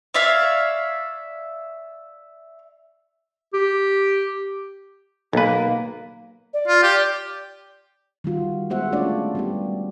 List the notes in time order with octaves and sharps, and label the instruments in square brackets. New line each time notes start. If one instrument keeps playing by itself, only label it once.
[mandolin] C#5 D5 E5 F5
[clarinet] G4
[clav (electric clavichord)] B1 B4 [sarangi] A#3
[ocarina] D5
[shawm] F4
G4
[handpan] D#3 G3 F4 F#4
G#3 B3 F#4 C5 E5 F#5
A3 C#4 D4 F4 C#5 D5
G3 B3 G4